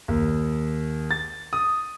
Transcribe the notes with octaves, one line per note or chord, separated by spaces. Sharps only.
D#2
A6
D#6